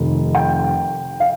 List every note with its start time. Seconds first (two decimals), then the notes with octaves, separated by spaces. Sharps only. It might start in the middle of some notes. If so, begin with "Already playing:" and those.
Already playing: F1 F2 D#3
0.35 G5
1.20 F5